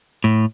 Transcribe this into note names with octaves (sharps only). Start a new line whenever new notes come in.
A2